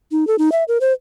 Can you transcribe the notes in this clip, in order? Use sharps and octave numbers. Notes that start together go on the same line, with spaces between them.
D#4
A4
D#4
E5
A#4
C5